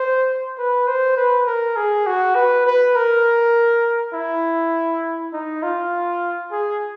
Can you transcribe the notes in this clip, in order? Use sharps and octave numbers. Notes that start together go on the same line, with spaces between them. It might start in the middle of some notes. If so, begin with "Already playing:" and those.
Already playing: C5
B4
C5
B4
A#4
G#4
F#4
B4
B4
A#4
E4
D#4
F4
G#4